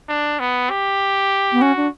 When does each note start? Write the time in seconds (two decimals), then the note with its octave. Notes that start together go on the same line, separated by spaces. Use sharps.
0.09 D4
0.40 B3
0.70 G4
1.52 B3
1.61 C#4 F#4
1.77 D4